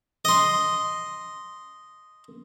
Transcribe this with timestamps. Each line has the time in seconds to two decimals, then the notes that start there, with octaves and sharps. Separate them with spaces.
0.25 D#5 C6